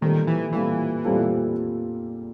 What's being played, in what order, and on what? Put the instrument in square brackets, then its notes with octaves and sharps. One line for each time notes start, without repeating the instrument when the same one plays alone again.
[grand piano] A#2 G3 C4 F4 A4 [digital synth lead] D#3
[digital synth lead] E3
[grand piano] A#2 G3 C4 F4 A4 [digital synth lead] E3
[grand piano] A#2 G3 C4 F4 A4